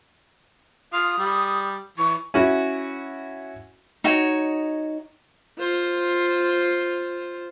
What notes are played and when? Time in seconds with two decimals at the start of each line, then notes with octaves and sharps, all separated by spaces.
0.93 F4 F5 D#6
1.18 G3
1.98 E3 C#6
2.34 C#4 E4 F#4
4.04 D#4 F#4 C#5
5.59 F4 C5